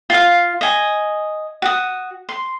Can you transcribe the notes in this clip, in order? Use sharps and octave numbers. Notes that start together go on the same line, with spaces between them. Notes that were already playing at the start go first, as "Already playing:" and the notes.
F4 F5
D#5 G#5
F#4 D#6
C6